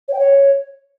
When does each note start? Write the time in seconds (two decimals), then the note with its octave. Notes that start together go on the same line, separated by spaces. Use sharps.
0.08 C#5
0.13 G5
0.19 C#5